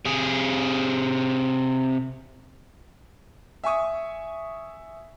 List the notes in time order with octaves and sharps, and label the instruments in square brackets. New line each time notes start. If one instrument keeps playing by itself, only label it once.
[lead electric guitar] C3 G#4
[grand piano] E5 G#5 C#6 D#6